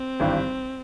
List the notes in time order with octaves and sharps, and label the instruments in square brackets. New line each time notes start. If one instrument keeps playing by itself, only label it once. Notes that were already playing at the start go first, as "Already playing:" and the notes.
Already playing: [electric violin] C4
[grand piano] G#1 G2 E3 G3